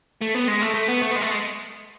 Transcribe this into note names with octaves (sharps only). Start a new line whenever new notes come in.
A3
B3
G#3
A3
A3
B3
A3
B3
G#3
A3
G#3